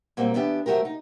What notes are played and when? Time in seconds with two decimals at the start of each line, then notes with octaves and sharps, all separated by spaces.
0.17 A#2 F#3 G3 A#3 C4
0.34 E2 B3 D4 G4
0.66 F2 F#3 A3 G4 A#4
0.85 D#4